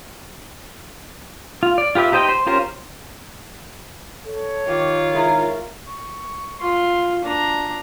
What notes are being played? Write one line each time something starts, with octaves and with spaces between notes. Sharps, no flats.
F4
D5
F4 G4 B4 E5
D#4 G4 C5 D#5 G5
C5
C#4 F4 G4 A#4 C5
A4 C#5
D#3 F4 G4
G#3 E4 A#4
C#6
F4 C6
D4 A#5